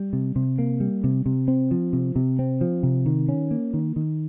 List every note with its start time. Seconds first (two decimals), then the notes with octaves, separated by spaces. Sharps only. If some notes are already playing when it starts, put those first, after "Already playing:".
Already playing: G3
0.13 C3
0.36 C3
0.58 A#3
0.80 G3
1.04 C3
1.26 C3
1.48 C4
1.71 F3
1.93 C3
2.16 C3
2.39 C4
2.61 F3
2.83 C3
3.06 D#3
3.29 C#4
3.51 A#3
3.74 D#3
3.96 D#3